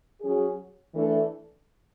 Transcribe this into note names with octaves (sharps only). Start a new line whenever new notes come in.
F#3 C#4 G#4
E3 A3 D4 A4